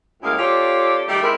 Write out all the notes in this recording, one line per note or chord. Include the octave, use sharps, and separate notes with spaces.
F#2 A2 G#3 A#3 E4 F5
C4 F4 G4 A4 C#5 D5
D#3 G3 A3 G4
G#3 C4 E4 A#4 E5